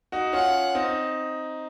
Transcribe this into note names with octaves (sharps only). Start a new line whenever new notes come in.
D#4 F#4
C#4 F4 F#5
C4 D#4